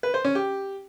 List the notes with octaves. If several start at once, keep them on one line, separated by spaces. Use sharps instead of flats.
B4
C5
C#4
G4